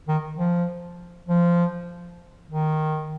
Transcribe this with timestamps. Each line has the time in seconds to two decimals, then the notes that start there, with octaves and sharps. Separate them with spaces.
0.08 D#3
0.38 F3
1.29 F3
2.50 D#3